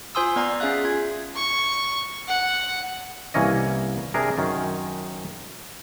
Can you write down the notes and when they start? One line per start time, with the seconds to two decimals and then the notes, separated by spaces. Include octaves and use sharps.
0.15 F4 C5 G#5 C6 D#6 E6
0.36 B3 D5 A#5
0.60 C#4 G#4 E5 F5 F#6
0.85 F4 G#6
1.36 C#6
2.28 F#5
3.34 C2 E3 A#3 C#4 D#5
4.14 C3 D4 G#4 A#4
4.38 F#2 D#3 C#4